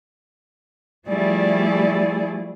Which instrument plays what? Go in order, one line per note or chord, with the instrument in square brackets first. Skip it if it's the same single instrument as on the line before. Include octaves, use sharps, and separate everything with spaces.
[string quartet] F3 G3 A3 E4 G#4 D5